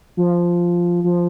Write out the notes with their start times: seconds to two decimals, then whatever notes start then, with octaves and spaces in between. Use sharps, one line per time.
0.17 F3
1.04 F3